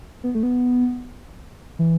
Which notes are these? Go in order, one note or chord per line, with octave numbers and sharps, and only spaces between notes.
B3
A3
B3
E3